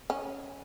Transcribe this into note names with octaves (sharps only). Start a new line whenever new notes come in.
C#4